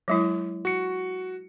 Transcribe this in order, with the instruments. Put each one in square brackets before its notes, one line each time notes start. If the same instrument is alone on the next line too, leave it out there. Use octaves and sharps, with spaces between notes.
[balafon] F#3 G#3 E4
[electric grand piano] F#4 C#7